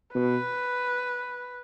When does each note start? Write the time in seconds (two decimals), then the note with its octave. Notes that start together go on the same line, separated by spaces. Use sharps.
0.15 B2 B4